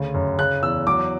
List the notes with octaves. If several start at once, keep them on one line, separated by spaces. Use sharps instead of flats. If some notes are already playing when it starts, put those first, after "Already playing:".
Already playing: D2 C#3
F#2
C#3 F#6
E2 E6
F#3 D6